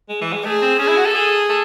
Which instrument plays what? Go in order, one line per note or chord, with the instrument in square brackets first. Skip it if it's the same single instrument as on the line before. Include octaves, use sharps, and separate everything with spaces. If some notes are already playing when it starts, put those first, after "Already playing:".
[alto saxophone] G#3
E3
G#3
[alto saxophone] A3 [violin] G#4
[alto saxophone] C4
[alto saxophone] C#4 [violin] G#4
[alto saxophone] E4
F#4
A4
[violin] G#4
[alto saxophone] A4